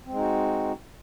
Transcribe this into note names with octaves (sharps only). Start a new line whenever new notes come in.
G#3 C4 D#4 F#4